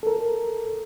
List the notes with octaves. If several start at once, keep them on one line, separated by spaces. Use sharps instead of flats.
A4 A#4